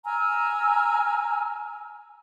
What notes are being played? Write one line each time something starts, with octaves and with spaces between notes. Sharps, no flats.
G#5 A#5 E6 F6